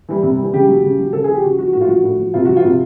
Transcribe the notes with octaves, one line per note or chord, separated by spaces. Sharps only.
E3 G3
C3
E3 G3
C#3 G4
F#3
C#3
F#3
C#3 A4
F3 G#4
G4
C#3 F#4
F3 F#4
A2 F#4
F4
F3 F#4
A2
F3
C3 F4
F3 F#4
F4
C3